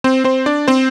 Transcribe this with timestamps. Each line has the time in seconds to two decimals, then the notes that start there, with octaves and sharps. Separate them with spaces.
0.04 C4 C5
0.24 C4 C5
0.46 D4 D5
0.68 C4 C5